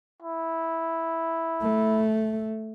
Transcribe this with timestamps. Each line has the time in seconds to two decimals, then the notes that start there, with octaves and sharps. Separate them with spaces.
0.22 E4
1.62 A3